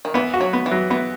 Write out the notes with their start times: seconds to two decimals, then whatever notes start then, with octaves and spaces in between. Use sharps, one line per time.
0.05 D#3
0.14 E3 B3
0.34 F#4
0.41 F#3
0.53 B3
0.66 E3
0.71 F#3
0.90 E3 B3